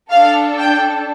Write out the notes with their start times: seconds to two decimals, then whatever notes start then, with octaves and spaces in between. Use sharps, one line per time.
0.10 D4 A4 F5
0.58 G5